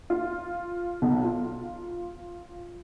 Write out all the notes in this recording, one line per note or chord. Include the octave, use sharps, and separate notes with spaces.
F4
B1
F4